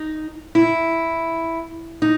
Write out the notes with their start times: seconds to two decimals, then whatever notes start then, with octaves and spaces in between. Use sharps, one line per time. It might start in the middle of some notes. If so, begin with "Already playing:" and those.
Already playing: D#4
0.55 E4
2.02 D#4